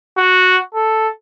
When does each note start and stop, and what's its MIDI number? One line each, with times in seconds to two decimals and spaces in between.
0.18 0.58 66
0.75 1.08 69